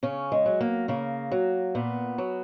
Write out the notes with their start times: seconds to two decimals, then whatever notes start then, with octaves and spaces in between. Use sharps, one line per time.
0.03 C#3 C#4
0.32 G#3
0.46 F#3
0.61 A#3
0.88 C#3 A#3
1.32 F#3
1.75 A#2 B3
2.18 F#3